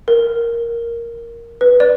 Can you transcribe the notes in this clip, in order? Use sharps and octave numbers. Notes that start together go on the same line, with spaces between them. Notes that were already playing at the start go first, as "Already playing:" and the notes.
A#4
B4
D5